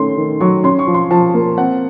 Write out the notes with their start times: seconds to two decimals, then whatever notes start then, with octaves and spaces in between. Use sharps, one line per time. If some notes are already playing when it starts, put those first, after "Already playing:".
Already playing: D#3 A3 C#4 C6
0.17 D#3
0.41 F#3 C#6
0.64 C#4 C6
0.79 C#6
0.87 F3
0.94 C6
1.11 F3 A5
1.34 A#3
1.57 C4 F#5